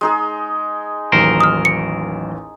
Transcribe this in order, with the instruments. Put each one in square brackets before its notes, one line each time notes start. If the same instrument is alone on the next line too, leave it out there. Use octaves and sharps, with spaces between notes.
[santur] G#3 D#4 G#4
[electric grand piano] A1 D#2 [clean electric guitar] F#3 A#4 C5
[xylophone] D#6 F6
C#7